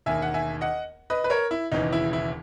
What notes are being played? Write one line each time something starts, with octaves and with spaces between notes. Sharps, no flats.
E1 D#2 D#3 E5 G#5
F#5
E5 G#5
D#5 F#5
B4 D#5
B4
A#4 C#5
E4
E1 D#2 C#3 E3 D#4
E4
E4